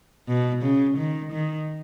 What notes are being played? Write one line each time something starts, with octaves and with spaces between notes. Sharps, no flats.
B2
C#3
D#3
D#3